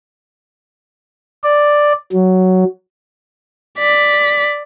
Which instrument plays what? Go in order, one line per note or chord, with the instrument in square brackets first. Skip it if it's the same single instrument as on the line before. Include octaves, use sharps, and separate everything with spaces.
[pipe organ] D5
F#3
[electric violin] D5 B6